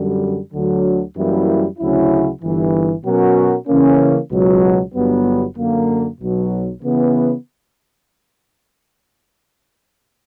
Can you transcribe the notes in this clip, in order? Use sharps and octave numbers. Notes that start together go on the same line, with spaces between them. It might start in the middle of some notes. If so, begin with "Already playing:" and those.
Already playing: F#2 D3 G3
D2 D3 F#3
F#2 E3 G3 A#3 E4
D2 C#3 F#3 C#4 E4
G1 G2 E3
B2 F#3 C#4 F#4 A#4
C#3 E3 A#3 C#4
C#2 B2 F#3
G1 G2 F#3 B3
F#2 D3 A#3
B1 B2 F#3
C#3 E3 B3